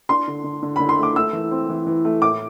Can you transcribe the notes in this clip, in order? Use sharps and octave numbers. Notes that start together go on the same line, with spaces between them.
D4 C6
D3
D3
D3
D3 B5
C6
A3 D6
A3 E6
E3
C4
E3
E3
A3
A2 D6